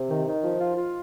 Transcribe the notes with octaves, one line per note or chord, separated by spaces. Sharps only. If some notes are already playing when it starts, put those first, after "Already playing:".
Already playing: C3
D#3
D#3
F3
F4
F4